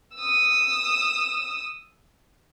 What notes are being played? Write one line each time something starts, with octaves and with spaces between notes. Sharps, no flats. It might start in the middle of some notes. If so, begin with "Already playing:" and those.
D#6 E6